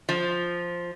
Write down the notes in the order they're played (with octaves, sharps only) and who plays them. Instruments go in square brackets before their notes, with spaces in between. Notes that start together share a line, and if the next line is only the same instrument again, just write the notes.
[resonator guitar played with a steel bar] F3